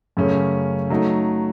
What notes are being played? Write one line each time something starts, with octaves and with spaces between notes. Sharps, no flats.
F#2 C#3 A3 C#4
F#3 A3 D#4